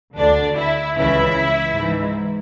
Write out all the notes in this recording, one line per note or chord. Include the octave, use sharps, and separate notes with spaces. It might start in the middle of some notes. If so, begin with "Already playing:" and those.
D2 D3 D4 D5
E4 E5
C#2 C#3 E3 E4 E5
G#2 E3